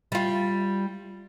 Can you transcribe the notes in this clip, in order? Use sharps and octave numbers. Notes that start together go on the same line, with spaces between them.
G3 F4